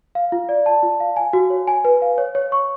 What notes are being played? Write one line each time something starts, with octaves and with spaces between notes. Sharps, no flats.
F5
F4
D5
A5
F4
F5
G#5
F#4
C#5
G#5
B4
F5
C#5
C#5
C#6